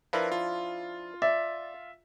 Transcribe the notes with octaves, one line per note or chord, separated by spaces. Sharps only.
F3 D4 E4 F4 A#4 B4
F4
D5 E5